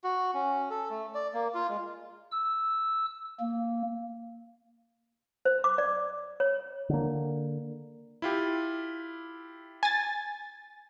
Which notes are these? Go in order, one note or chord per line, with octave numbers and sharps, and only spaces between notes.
F#4
C#4
A4
A3
D5
A#3
F4
G#3
E6
A#3
C5
D6
D5
C#5
D3 A#3
E4 F4 G4
G#5 A6